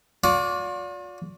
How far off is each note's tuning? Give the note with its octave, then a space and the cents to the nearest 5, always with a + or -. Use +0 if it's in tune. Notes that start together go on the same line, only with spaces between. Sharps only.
F4 +45 D5 -30